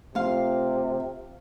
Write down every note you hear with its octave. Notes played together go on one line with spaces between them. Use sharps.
C3 A3 F4 F5 C6